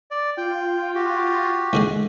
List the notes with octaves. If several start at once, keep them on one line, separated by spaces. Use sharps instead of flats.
D5
F4 G5
F#4 G4
G#2 D3 G#3